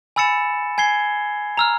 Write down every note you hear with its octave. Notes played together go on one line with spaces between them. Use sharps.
G#5 B5 E6 A6 C#7 E7
G#5 G#6 C7 G7
A#5 E6 F6